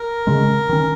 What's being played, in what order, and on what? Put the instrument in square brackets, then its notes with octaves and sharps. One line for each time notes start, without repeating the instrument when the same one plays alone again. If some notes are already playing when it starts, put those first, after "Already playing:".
Already playing: [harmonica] A#4
[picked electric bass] C#3 G#3 C#4
D#3 C#4